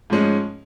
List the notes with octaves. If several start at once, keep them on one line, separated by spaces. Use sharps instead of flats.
G#2 F3 G#3 C#4